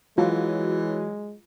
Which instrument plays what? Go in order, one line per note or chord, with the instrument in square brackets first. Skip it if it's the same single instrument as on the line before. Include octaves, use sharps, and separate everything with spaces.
[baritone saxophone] E3 [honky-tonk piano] F#3 [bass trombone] G#3 [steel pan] F4